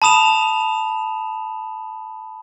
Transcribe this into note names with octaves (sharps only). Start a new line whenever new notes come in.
A5 B5 D#6 E7 F7